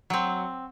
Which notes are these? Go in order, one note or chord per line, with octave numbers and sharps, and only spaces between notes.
F#3 C4